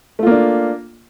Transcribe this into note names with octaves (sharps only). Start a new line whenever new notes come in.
A3 A#3 D4 F4